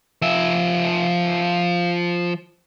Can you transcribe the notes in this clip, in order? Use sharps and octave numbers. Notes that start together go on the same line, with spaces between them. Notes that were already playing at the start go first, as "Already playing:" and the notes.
F3 E5